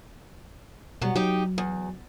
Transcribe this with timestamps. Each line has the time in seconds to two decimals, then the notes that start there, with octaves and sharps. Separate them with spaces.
1.01 B2 F#3 G3 B3
1.16 F#3 D#4 G4
1.58 E2